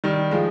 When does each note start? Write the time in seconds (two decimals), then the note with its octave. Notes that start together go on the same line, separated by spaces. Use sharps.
0.04 D#3 G3
0.31 F3 G#3